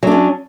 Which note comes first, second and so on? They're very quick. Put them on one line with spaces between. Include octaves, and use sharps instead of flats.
F#3 D4 C#4